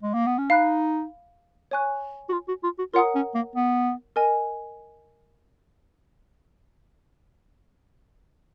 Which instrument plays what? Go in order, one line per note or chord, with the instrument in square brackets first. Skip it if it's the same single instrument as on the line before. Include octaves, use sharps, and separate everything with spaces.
[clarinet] G#3
A#3
B3
C#4
[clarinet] D#4 [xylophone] F5 B5 F#6
[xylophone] C#5 G#5 C#6 F#6
[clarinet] F#4
F4
F#4
F4
F#4
[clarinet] F4 [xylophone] A#4 C#5 F#5 A#5 D#6
[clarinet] C#4
A#3
B3
[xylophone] A#4 D#5 G#5